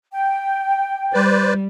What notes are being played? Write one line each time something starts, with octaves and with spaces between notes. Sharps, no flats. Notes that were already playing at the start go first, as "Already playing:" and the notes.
G5
G3 B4 C5 D5